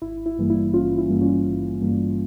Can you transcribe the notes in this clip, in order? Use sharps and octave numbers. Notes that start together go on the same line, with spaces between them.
G#1 E4
E4
G2 E3 G3 A#3
E4
G#1 C#4 F4
E4
G2 E3 G3 A#3
C#4 F4
G#1
G2 E3 G3 A#3